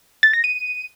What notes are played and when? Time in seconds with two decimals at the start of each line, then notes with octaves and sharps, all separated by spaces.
0.23 A6
0.33 A#6
0.44 D#7